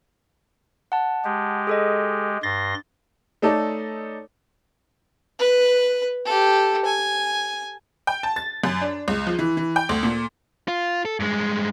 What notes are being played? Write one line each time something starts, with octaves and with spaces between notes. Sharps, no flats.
F#5 A5
G#3 G4
G#4 A4 D#5
G2 C6 A6 A#6
A3 D#4 A4 C#5 D5
B4
G4 A4
G#5
G5
A5
A6
F#2
D4
C#2
F3
E3
E3
G5
D2
A#2
F4
A4
G2 G#3